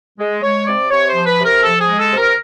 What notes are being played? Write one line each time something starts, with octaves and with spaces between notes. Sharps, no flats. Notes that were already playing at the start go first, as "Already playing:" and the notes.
G#3
G#3 C#5
C3 D5
C3 C#5
C5
F3
B4
C3
A#4
F3 A4
G#4
G#3
A4
C3
A#4